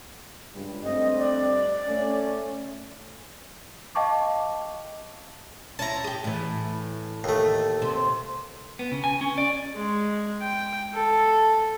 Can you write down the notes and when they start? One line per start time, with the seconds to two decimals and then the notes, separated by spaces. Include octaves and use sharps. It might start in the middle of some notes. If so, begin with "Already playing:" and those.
0.54 C#2 G2 G3
0.84 G2 A3 C4 D#5
1.17 D5
1.87 A3 C#4
3.95 D#5 F5 G5 A5 C#6 D6
5.79 C#4 E4 A5 A#5
6.04 G4 G#4
6.24 A2 E3
7.24 D#2 A3
7.82 C3 C4
8.79 B3
8.92 C#3
9.04 G#5
9.21 C#4
9.38 D5
9.76 G#3
10.42 G5
10.94 A4